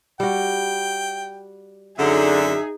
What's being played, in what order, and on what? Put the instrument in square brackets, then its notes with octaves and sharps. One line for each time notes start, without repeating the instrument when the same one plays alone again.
[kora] G3 F#4 [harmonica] G5
[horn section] F#2 D3 [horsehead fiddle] D#4 G#4 [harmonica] E5